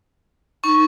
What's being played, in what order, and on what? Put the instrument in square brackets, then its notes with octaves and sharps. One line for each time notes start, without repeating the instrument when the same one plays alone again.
[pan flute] D#4 [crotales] C#6